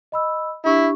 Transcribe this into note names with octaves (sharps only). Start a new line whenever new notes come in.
D#5 B5 E6
D4 E4 G4 C#6